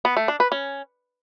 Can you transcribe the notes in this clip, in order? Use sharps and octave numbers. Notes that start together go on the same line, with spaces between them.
B3
A3
D4
B4
C#4